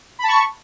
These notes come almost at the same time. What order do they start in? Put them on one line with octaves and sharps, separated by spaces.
B5 A5 C#6